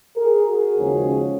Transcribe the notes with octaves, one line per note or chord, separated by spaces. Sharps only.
G#4 A#4
F#4 G#4
D#2 C#3 F3 G#3 C#4